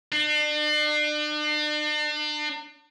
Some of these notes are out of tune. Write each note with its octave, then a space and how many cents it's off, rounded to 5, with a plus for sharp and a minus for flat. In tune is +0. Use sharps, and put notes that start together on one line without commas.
D4 +40